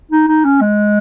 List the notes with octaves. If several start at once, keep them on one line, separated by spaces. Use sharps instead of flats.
D#4
D#4
C#4
G#3